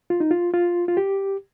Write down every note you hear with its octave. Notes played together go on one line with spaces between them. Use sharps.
F4
D#4
F4
F4
F4
G4